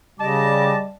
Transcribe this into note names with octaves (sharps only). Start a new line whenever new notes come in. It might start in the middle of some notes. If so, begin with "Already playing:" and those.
C#3 G3 D#5 A5 D6